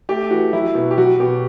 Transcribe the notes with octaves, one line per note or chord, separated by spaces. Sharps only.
A3 G4
E3 F#4
F#3 E4
B2
G4
F#3 F#4
B2 G4